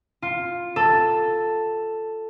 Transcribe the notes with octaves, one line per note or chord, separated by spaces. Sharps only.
F4
A4